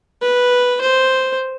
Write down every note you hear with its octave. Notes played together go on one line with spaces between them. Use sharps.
B4
C5